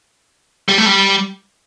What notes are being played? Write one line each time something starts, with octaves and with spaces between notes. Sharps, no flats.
G3
A3
G3